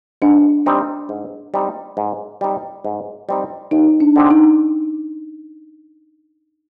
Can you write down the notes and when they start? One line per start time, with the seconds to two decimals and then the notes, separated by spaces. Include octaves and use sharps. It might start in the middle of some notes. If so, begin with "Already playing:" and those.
0.22 G#2 D4
0.66 G3 C4 D#4
1.09 G#2
1.54 G3 C4 D#4
1.97 G#2
2.41 G3 C4 D#4
2.85 G#2
3.29 G3 C4 D#4
3.71 D#2 D#4
4.00 D4
4.16 D3 G#3 C4 G4
4.31 D#4